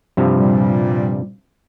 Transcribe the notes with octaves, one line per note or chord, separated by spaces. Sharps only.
G2 C3 F3
A#2 G3